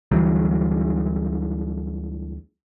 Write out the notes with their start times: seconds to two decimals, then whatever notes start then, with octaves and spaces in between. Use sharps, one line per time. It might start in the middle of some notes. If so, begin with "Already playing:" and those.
0.11 D2 E3 F#3 G3